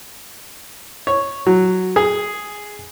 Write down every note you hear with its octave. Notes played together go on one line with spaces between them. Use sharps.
C#5
F#3
G#4